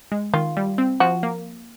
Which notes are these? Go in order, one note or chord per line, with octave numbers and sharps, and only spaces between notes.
G#3
D#3 F4
G3
C4
F3 F#4
A#3